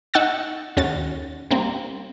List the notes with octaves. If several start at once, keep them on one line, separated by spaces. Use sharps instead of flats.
D#4 F#5 C#6 E6 A6
D#2 C#4 F#4 A6
G3 A#3 C4